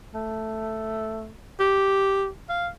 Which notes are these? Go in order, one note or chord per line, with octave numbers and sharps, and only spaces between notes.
A3
G4
F5